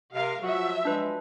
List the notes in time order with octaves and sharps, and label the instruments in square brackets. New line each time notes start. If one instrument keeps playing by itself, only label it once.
[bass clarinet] C3 [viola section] A#4 F5
[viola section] F3 F#3 E5 [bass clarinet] F#4
[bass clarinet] G#3 [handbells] D4 B4